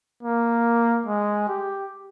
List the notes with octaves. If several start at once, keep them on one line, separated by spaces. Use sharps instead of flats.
A#3
G#3
G4